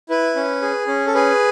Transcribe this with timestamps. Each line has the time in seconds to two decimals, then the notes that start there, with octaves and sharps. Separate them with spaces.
0.09 E4 B4
0.36 C#4
0.62 G#4
0.87 C#4
1.07 A4
1.14 G#4 B4